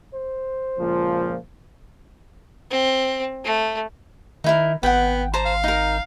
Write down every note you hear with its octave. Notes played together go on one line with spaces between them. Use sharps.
C5
C#2 A#2 F3
C4
A3
D#3 D#4 E4 A#4
G#1 B3 F#5 G5
C5 A5 A#5
F5
D#4 A#4